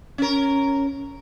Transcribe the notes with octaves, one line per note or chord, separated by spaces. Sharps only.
C#4 A#4